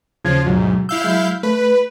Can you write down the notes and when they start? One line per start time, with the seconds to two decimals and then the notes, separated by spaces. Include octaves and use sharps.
0.24 D#2 C#3 F3 F4 G#6
0.45 D2 G#2 B2 F#3
0.89 E4 F5 E6 G6
1.02 F#3 G#3 E5
1.43 A3 B4